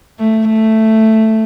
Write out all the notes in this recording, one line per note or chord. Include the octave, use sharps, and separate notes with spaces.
A3
A3